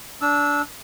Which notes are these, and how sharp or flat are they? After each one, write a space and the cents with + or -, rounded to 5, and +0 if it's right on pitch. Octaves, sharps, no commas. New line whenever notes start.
D4 -20 E6 -10